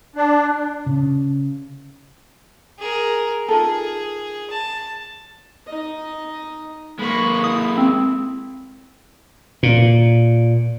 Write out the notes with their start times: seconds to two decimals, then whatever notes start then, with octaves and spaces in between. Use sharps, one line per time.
0.16 D4
0.86 C#3
2.79 G#4 A#4
3.48 D#4 F4 G#4 A4
4.50 A5
5.67 D#4 D#5
6.99 G#3 A#3 B5 C#6
7.44 E4 D#6
7.78 C4
9.63 A#2